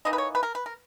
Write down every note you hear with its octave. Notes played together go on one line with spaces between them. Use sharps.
E3 A#3 D#4 D#5
B4
C#5
B4
A#4
B4
A#4